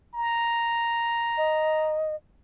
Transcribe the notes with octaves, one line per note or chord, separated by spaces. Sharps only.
A#5
D#5